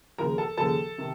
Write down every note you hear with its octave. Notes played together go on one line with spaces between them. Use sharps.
D#2 C#3 F3 A#4 A#5
A4 A5
D#2 C#3 F3 A4 A5
C3 D#3